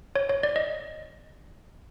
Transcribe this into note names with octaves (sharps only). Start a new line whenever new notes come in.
C#5
C#5
D5
D#5